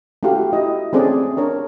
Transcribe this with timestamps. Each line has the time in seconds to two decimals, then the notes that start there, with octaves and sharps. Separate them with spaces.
0.23 A3 C#4 E4 F#4 G4 F5
0.53 E4 D#5
0.93 A3 C4 C#4 G#4 D5
1.37 D4 A#4 C#5